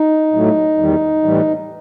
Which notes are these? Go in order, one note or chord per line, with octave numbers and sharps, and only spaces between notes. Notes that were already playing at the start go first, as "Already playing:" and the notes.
Already playing: D#4
A2 F#3 A3
E2 D#3 G3
A2 E3 G3